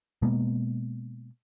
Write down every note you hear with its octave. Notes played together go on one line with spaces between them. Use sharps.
B2 G#3 A#3 B3